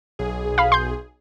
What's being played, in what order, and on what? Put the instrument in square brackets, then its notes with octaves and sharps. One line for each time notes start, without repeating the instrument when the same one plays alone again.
[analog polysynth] B1 G#4
[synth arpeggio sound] F5 B5
C6 G6